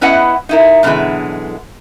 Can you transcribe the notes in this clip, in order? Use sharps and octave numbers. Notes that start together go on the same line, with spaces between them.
B3 C#4 E4 B4 D#5 F#5
D#4 E4 A#4
F#2 B2 D3 E3 G#3